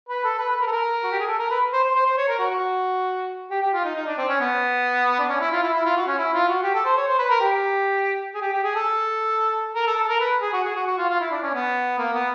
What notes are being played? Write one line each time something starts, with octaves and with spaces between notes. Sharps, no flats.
B4
A4
B4
B4
A#4
A4
A#4
F#4
G4
G#4
A4
A#4
B4
C5
C5
C5
C5
C#5
A#4
F#4
F#4
G4
G4
F4
D#4
D#4
D4
C4
C#4
B3
D4
C#4
E4
F4
E4
E4
F4
F#4
C#4
E4
F4
F#4
G4
A4
C5
C#5
C5
B4
A#4
G4
G#4
G4
G4
G#4
A4
A#4
A4
A4
A#4
B4
G#4
F#4
G#4
F#4
F#4
F4
F4
E4
D4
C#4
B3
A#3
B3